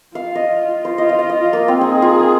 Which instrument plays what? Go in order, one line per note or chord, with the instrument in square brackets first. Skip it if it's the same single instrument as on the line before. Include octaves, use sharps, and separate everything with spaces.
[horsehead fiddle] F4 [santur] F5
[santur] D#5
C5
[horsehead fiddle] F4 [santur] D#5
[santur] D#5
F5
D#5
[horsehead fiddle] F4
[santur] A#3
C4
[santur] D#4 [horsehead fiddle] G#4
[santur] F4